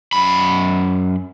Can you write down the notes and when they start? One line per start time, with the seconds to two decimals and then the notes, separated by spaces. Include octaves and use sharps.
0.13 F#2 B5